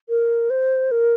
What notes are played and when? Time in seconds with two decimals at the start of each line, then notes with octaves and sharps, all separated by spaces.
0.09 A#4
0.50 C5
0.91 A#4